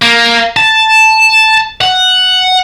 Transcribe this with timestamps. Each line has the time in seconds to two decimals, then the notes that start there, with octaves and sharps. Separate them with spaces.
0.03 A#3
0.57 A5
1.81 F#5